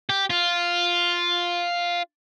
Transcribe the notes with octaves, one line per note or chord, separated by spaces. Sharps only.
G4
F4